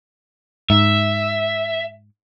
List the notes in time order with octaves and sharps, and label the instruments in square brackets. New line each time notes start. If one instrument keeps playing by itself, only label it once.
[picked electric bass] G#2 [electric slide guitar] E5